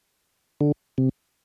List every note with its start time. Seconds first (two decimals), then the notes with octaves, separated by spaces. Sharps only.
0.61 D3
0.98 C3